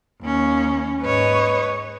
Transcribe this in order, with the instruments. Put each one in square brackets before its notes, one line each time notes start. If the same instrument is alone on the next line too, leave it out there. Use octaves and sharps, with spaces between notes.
[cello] D#2 C#4
[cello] G#2 C#5 [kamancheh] B4 D#5